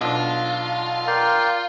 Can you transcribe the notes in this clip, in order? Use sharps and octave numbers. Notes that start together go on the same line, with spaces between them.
B1 D4 F4
A#4 D5 G5 C6